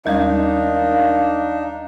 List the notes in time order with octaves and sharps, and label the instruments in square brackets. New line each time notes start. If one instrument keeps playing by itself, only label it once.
[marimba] D#2 G3 G#3 [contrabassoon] D#3 [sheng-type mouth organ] D4 D#4 [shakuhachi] F5